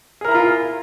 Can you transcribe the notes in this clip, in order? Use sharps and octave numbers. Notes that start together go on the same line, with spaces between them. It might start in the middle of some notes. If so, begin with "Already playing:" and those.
E4 F4 G#4 A#4 A#5